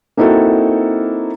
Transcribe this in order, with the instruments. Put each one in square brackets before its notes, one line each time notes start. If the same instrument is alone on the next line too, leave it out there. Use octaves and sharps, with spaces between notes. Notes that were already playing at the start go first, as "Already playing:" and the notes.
[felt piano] A#3 C4 D#4 E4 F#4 A4